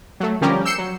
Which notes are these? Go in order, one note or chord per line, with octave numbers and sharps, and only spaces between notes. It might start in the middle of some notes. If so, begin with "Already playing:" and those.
F#3 A3
D3 F3 G3 C#4 G4 A#4
E6 G6 C7 C#7 E7
F#3